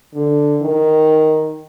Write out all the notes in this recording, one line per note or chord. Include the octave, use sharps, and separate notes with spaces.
D3
D#3